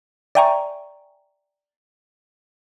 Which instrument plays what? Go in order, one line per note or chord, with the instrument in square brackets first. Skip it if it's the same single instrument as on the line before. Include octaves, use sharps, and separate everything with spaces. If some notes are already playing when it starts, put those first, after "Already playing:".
[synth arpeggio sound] D5 E5 G5 G#5 A#5 C#6